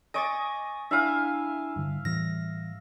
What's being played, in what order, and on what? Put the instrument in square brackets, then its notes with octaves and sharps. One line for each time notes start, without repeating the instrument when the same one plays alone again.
[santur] D#5 D6 [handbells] G#5 C#6 A6
[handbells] D4 E4 G#5 [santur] E5 F5
[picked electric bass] G2 D3
[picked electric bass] A2 E3 G3 [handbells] A#6